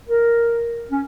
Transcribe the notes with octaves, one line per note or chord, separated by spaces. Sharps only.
A#4
C#4